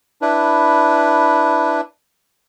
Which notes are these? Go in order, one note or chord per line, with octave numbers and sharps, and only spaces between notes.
D4 E4 B4